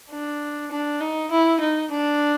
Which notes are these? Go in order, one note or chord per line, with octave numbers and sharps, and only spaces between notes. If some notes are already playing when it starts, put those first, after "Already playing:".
D4
D4
D#4
E4
D#4
D4